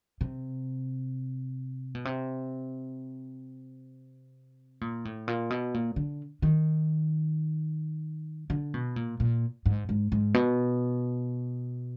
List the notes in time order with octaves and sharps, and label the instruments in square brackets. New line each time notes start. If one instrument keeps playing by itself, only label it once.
[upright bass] C3
B2
C3
A#2
A2
A#2
B2
A#2
D3
D#3
D3
B2
A#2
A#2
G#2
G#2
G#2
B2